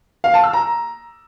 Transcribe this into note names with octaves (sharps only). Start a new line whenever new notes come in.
F5
A5
E6
A#5